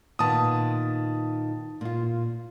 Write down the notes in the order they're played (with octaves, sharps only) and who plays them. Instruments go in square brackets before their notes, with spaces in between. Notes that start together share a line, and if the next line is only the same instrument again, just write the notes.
[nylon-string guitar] A#2 D#3 B3 [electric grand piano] A5 D#6
[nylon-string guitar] A#2 F4